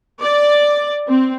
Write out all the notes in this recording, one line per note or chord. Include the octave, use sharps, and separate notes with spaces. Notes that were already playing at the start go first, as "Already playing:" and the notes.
D5
C4